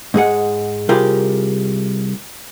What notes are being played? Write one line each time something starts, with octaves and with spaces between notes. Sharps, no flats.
G#2 G#3 G#4 F#5
C2 F4 G4 G#4 A#4